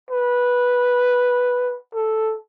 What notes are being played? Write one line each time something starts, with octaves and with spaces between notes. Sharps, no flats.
B4
A4